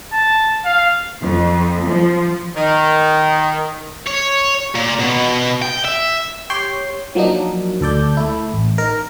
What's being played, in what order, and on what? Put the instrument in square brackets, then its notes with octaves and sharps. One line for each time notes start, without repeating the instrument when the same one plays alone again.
[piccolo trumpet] A5
F5
[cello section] F2
F3
[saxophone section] D#3
[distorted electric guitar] C#5
A#2
B2
G5
E5
[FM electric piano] G4 C#5 G5 C6
F3 F#3 A#3 D4 D#4
D2 A4 D5 G6
A3 E4
A1
D#4 A#4